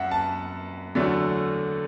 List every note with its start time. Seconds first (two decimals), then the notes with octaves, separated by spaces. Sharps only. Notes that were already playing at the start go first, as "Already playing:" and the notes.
Already playing: F#2 E5 F#5
0.11 A5
0.95 E2 D3 F#3 A3